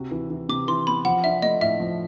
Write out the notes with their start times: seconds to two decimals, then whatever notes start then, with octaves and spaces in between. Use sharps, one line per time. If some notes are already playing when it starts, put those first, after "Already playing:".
Already playing: C3 F#4
0.11 E3
0.30 E3
0.49 C3 D6
0.68 E3 C6
0.87 B3 B5
1.05 F3 F#5
1.24 D4 E5
1.42 A3 D#5
1.61 A2 E5
1.80 F3